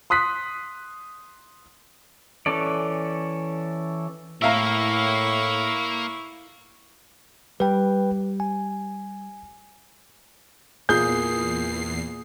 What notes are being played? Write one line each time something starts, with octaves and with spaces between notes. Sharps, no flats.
C6 D#6 F#6 B6
E3 C#4 A4 D5
A2 A#3 E4 A#4 E5 F5 A#5 C#6
G3 B4 G5
G#5
E2 A#2 G#4 G6 C7